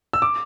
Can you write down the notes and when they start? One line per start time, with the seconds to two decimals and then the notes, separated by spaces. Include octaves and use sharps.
0.13 E6
0.22 D6